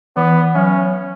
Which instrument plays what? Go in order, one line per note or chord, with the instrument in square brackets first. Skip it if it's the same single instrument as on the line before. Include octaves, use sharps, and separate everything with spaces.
[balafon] E3 [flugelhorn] B3
[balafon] F#3 [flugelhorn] C#4